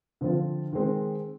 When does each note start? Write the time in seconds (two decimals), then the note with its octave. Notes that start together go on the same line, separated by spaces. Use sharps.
0.21 D3 F3 C4 F4
0.73 D#3 G#3 C4